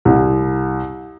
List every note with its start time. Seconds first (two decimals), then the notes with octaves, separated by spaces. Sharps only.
0.05 C2